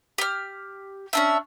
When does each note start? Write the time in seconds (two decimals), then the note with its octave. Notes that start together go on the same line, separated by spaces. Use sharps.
0.18 G4 F6
1.13 C#4 D4 E5